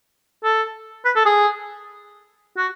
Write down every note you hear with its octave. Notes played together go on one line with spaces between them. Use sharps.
A4
B4
A4
G#4
F#4